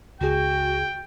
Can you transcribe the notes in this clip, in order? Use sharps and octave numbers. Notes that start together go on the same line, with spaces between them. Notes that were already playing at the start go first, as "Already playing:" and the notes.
C#2 F#4 G#4 G5